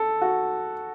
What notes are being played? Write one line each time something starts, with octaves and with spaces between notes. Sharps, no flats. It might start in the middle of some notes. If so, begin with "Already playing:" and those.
Already playing: A4
F#4